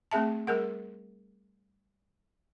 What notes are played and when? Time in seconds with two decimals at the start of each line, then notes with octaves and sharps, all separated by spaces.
0.11 A3 C4 G#4 E5 A5
0.47 G3 G#4 A#4 F#5